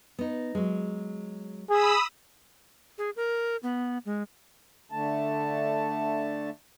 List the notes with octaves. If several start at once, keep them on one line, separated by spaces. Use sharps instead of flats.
B3 D#4
F#3 G#3
G#4 B5 D#6 E6
G#4
A#4
B3
G#3
D3 A3 A5